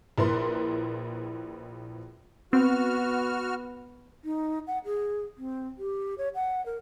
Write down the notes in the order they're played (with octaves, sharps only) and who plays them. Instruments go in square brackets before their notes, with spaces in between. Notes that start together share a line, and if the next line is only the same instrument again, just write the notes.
[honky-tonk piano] A#1 E4 A#4 B4 C6
[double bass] B3 [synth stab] C4 [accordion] F#4 F6
[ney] D#4
F#5
G#4
C4
G4
C#5
F#5
A#4